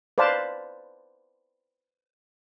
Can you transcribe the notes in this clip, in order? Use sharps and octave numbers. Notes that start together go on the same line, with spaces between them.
B4 C5 D5 F5 A5